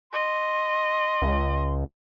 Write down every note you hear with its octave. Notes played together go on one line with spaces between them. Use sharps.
D#5 C6
C#2